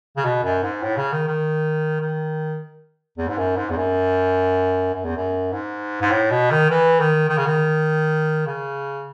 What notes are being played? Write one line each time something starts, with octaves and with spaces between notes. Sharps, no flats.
C#3
B2
F#2
G#2
A2
C#3
D#3
D#3
D#3
E2
G#2
F#2
G#2
E2
F#2
F#2
E2
F#2
G#2
G#2
A2
B2
D#3
E3
D#3
D#3
C#3
D#3
C#3